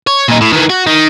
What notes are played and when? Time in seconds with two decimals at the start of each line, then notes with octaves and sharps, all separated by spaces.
0.07 C#5
0.28 A#2 D#4
0.41 A2
0.53 D#3 E3
0.70 F#4
0.87 D#3